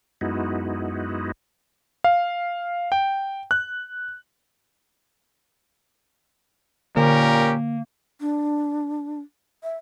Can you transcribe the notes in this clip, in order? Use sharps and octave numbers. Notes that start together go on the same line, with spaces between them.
F#2 G#3 B3 D#4 E4 F#4
F5
G5
F#6
A#2 D3 A#3 C#4 G4 A#4
D4
E5